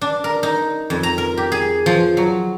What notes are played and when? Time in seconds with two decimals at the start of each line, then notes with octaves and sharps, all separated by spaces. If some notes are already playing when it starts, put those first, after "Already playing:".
0.01 D4
0.24 A#4
0.43 D#4
0.90 F2
1.03 A#5
1.18 A#4
1.37 G4
1.52 G#4
1.86 F3
2.17 F#3